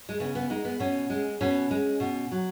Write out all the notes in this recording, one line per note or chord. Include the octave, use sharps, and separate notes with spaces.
G#3
C#3 B3
B3
G#3 D#4
B3
B2 C#4
G#3
B2 C#4
G#3
B2
F#3